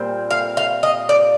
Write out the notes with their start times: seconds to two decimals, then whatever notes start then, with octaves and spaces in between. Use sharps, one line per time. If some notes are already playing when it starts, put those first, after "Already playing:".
Already playing: A#2 G3 C4
0.31 F5
0.57 F5
0.83 D#5
1.09 D5